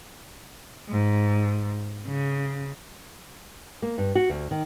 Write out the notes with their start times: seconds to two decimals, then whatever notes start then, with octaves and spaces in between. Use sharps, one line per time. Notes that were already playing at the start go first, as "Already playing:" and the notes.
0.89 G#2
2.07 C#3
3.82 A#3
3.98 G2
4.15 F#4
4.30 D2
4.51 D#3